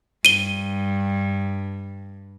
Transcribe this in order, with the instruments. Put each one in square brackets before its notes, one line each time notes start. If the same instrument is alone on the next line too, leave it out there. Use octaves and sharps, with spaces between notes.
[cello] G2 [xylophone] D#7 G7